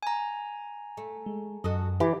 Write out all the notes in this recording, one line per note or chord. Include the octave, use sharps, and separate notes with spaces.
G#5 A#5
A3
G#3
F#2 F#4 A4 D#5
E3 G4